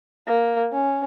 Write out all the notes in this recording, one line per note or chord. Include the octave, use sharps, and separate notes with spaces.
A#3
C#4